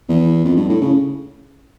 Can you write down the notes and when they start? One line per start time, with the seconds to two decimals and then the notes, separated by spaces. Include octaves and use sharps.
0.09 E2
0.44 F2
0.57 G2
0.69 A2
0.81 C#3